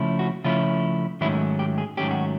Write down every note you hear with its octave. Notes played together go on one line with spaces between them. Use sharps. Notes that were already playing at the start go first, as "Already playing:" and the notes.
Already playing: C#3 F3 A3 C#4 E4
F#4
C#3 F3 A3 C#4 E4 F4
G#2 D#3 F#3 A3 C#4 E4
G4
G#4
G#2 D#3 F#3 A3 C#4 G4
F#4